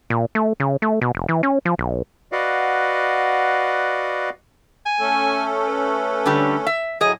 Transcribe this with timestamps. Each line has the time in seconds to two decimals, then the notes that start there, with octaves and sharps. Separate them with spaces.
0.10 A#2
0.35 A3
0.60 C#3
0.82 A3
1.01 B2
1.15 F1
1.29 E3
1.43 C#4
1.65 F3
1.78 B1
2.32 F#4 B4 D5 D#5 F5 F#5
4.86 G#5
5.00 A3 C#4 A4
5.67 B4
6.26 D3 G3 G4
6.67 E5
7.01 A2 F#3 G#4 D#5